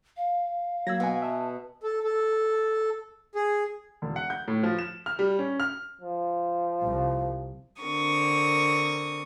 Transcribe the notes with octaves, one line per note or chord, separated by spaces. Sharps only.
F5
F#3 A#3 B5 E6 G#6 A#6
B2 F#5 G#5
E5 A5
A4
A4
G#4
E1
F#5
G6
A2
F3
E7
F6
G3
C#4
F6
F3
C2
D3 C4 A#4 C#6 D#6